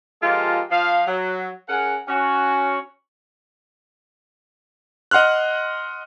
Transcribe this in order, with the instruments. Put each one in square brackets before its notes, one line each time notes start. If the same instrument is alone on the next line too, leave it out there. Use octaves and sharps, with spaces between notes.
[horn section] F3 G#3 F4 G4 A4 A#4
F3 F5
F#3
C#4 G#4 A#4 F#5
C#4 F#4
[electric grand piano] D#5 F#5 C6 F6 F#6